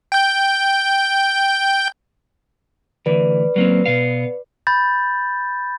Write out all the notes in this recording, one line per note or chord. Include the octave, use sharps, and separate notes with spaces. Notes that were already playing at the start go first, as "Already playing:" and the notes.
G5 G6
D2 E3 B4 D5
F#3 A#3 C4
B2 B3 F5
B5 G6 A6